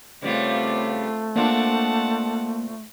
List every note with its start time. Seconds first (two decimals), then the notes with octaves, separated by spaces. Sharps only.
0.22 C#3 G3 A3 B3 C4 F4
1.36 A#3 C4 D4 F4 F#5 A5